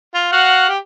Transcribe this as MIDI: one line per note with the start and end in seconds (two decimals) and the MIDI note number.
0.14 0.31 65
0.32 0.68 66
0.32 0.68 77
0.32 0.68 78
0.69 0.78 67